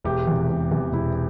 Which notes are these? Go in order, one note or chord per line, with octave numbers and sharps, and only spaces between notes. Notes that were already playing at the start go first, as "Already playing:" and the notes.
E1 G4
E2 C3
E1
E2 C3
E1 E4